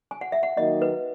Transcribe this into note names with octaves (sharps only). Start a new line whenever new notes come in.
G#5
F#5
E5
F#5
D#3 F#3 A#3 D#4 D#5
B4